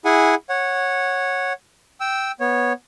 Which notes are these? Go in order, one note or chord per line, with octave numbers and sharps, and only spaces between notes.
E4 G#4 F#5 G#5
C#5 F#5
G5 E6
B3 C#5